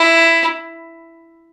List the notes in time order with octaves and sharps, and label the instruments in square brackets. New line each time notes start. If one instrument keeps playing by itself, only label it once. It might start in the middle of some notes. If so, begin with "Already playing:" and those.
Already playing: [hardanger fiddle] E4